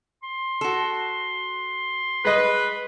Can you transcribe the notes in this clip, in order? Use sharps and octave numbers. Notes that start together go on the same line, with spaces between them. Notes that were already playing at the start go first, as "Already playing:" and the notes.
C6
F#4 A4
G#3 B4 D#5